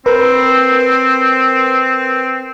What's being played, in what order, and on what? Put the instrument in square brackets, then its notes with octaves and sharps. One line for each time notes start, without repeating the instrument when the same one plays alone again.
[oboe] C4 [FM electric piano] A#4 B4